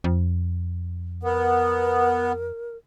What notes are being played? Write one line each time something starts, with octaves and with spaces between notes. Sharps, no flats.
F2
B3 A#4